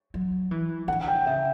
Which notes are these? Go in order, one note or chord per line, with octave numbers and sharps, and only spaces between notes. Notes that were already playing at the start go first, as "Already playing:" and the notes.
F#3
E3
D3 F#5
F#5
G5
C#3 E5